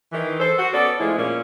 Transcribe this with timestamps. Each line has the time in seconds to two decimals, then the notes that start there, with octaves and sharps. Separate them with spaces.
0.12 D#3 E3
0.39 A4 C5
0.58 F#4
0.72 B3 C#4 A4 D5
1.00 F2 F3 G#3 A3 E4
1.18 A#2 C#4